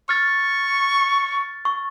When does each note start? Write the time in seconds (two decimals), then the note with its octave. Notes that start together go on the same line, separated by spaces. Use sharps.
0.09 C#6 F6 A6
1.65 C#6